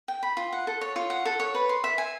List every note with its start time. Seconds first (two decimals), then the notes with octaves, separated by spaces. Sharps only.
0.08 G5
0.23 B5
0.37 F4
0.52 F#5
0.67 A4
0.81 C#5
0.96 F4
1.10 F#5
1.25 A4
1.40 C#5
1.55 B4
1.69 C6
1.84 E5
1.98 G#5